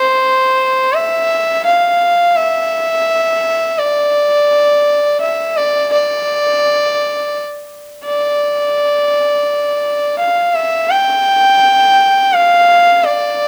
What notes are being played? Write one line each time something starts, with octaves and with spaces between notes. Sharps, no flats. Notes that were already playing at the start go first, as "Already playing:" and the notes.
Already playing: C5
E5
F5
E5
D5
E5
D5
D5
D5
F5
E5
G5
F5
D5